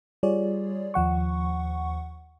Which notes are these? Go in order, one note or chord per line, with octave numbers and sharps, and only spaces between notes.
G3 F4 G#4 C#5 D5
D#2 F3 F#5 C#6